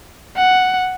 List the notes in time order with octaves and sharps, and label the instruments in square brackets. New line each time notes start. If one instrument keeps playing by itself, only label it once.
[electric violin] F#5